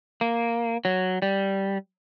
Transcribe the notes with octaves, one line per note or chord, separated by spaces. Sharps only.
A#3
F#3
G3